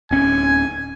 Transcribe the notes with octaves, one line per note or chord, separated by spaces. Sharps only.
D1 C#4 G#5